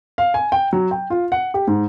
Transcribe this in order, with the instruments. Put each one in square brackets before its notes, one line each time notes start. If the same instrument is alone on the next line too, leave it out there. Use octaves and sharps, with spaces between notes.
[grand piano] F5
G#5
G5
F#3
G5
F4
F#5
G4
G#2